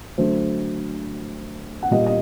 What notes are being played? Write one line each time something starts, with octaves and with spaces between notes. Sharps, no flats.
D3 F#3 A3 C5
F#5
A#2 G3 A#3 D#5
D#5